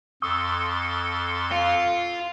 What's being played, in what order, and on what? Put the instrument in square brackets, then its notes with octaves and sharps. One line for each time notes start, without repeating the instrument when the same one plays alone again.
[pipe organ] F2 A4 C6 [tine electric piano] C#6 D#6 E6
[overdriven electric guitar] F4